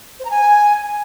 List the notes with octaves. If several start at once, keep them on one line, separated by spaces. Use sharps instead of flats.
C5
A#5
G#5